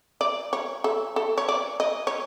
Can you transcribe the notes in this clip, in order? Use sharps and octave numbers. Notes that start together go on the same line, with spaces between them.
D5
C#5
A4
A4
C#5
D5
D#5
C#5